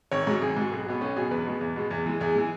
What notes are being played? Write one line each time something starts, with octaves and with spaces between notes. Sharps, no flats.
G#1 C#5
G#2 F#3
G#1 G#4
G#2 F#3
B1
B2 F#3 B3
B1 C#4
B2 F#3 G#4
E2 B4
B2 G#3
E2
B2 G#3
E2
E3 G#3
E2 G#4
E3 G#3